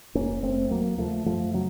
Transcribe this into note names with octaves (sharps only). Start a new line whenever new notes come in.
F1 A#3 C#4
F1 A3 C4
D#2 F#3 A#3
C#3 F3 A3
F#2 F3 A3
C#3 F#3